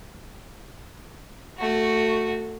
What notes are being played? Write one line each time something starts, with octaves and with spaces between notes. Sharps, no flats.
A3 F#4